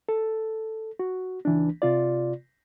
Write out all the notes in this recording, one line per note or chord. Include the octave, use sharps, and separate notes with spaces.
A4
F#4
C#2 E3 D4
C3 F4 D5